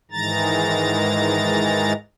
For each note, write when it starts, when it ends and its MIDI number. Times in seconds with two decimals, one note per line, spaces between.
0.11 1.93 44
0.11 1.93 51
0.11 1.93 52
0.11 1.93 56
0.11 1.93 82
0.11 1.93 93